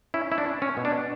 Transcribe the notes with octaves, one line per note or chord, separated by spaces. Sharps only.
C#4 E4
E4
D4
C#4
C#4
B2
D4